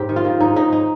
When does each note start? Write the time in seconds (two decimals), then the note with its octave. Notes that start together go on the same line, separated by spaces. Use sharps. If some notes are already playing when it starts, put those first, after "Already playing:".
Already playing: G#2 G4
0.09 D#3
0.16 F4
0.25 D#3
0.40 G#2 D#4
0.56 G#2 D#4
0.72 D#4